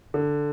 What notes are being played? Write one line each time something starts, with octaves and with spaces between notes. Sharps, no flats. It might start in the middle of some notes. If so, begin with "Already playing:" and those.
D3